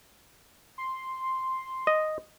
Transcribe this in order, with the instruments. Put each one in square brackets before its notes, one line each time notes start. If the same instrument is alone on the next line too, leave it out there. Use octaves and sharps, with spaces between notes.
[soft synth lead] C6
[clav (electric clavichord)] D#5